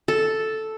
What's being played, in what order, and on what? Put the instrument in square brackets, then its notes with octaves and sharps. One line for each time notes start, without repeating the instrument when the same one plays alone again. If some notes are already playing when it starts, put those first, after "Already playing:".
[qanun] A4